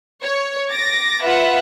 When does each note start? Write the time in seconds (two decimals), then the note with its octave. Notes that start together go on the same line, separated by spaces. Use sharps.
0.23 C#5
0.71 D6 A6 A#6
1.24 F4 B4 E5 F#5